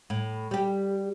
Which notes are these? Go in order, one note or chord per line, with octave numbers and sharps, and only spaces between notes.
A2
G3 G4